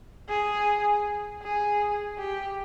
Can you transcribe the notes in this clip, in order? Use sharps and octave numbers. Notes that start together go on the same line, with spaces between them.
G#4
G#4
G4